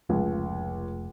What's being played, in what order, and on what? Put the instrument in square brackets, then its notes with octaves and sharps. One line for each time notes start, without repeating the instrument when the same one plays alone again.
[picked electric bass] F1 F3 A3 [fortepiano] C#2